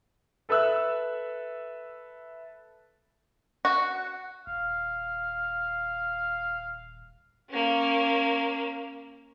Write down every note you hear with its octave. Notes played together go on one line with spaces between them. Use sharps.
A4 B4 E5 E6 F#6
F#4
D#1 F5
A#3 C#4